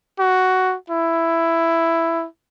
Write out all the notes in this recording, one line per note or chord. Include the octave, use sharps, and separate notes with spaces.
F#4
E4